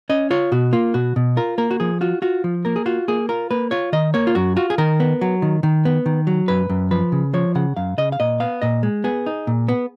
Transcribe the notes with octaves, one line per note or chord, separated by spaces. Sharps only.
C#4 D#5
F4 C#5
B2 F#4
A#3 F4
B2 F#4
B2
F4 A#4
A#3 A#4
F#4
F3 G#4
F4 F#4
F4 F#4
F3
A#3 A#4
G#4
F4 F#4
A#3 G#4
F4 A#4
A#3 B4
F4 C#5
D#3 D#5
A#3 C#5
F4
F#2 F#4
F4 F#4
G#4
D#3 A#4
B3
F#3
D#3
D#3
B3
D#3
F#3
F#2 B4
F#2
F3 B4
C#3
F3 C#5
C#3 F#5
F#2 F5
C#3 D#5
F5
A#2 D#5
B3 F5
A#2 D#5
G#3
B3 G#4
D#4
A#2
B3